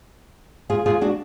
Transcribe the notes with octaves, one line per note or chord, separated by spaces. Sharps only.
F4 G#4
F4 G#4
D4 F#4